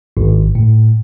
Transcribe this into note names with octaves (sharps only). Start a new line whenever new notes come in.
G#1
A2